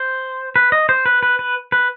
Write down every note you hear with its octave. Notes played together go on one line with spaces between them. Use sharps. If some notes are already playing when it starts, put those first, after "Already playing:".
Already playing: C5
B4
D#5
C5
B4
B4
B4
B4